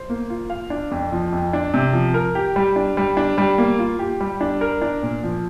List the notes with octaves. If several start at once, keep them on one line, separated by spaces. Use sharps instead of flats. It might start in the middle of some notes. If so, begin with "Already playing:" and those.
Already playing: C5
A#3
F4
F5
D4
F2
F3
F2
D4
C3
F3
A#4
G4
G3
D4
G3
D4
G3
A#3
F4
G4
G3
D4
A#4
D4
A#2
F3